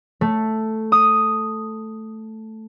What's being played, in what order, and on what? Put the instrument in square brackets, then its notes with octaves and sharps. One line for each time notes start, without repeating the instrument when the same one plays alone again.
[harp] A3
D#6